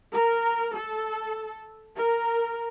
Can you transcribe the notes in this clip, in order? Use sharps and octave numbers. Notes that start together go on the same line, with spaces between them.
A#4
A4
A#4